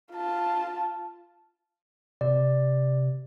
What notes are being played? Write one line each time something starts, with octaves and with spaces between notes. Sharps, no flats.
F4 A5
C3 D5